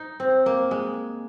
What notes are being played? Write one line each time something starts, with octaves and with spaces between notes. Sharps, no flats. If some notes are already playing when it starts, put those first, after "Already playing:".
Already playing: D#4
C4
A#3
G#3